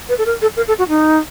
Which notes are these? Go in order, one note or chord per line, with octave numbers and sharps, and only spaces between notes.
B4
A4
A#4
A4
A#4
A4
F#4
D#4